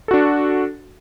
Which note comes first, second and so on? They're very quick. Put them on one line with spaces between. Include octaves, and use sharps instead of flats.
A4 F#4 D4